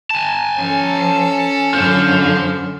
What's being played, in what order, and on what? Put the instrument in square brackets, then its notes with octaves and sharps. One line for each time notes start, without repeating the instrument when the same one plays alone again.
[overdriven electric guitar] G#5 A5
[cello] F3 [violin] C#4 A4
[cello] F#2 D3 [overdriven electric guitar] F4 C5